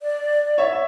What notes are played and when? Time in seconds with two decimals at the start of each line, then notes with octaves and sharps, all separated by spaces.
0.01 D5
0.58 C#5 E5
0.73 E5